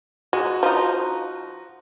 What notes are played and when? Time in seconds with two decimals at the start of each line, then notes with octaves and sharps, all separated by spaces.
0.33 G#3 F#4
0.63 F3 D#4